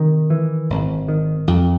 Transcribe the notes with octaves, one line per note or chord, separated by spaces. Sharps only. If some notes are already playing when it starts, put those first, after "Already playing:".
Already playing: C3 D#3
E3
G#1
D#3
F2